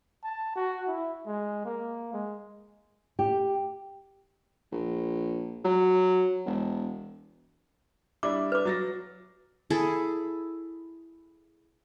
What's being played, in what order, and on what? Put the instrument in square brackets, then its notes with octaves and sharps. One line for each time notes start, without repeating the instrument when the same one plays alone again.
[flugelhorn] A5
F#4
E4
G#3
A#3
G#3
[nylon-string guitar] G4
[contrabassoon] A#1
F#3
E1
[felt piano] G3 D4 E4 [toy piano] D6
[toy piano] B4 D6
[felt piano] F#3 A6 A#6
[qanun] E4 G#4 A4